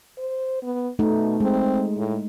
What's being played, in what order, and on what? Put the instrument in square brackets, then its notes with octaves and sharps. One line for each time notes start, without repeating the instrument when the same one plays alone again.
[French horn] C5
B3
[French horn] B2 [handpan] A3 D#4
[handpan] G#3 [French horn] C4
[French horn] A2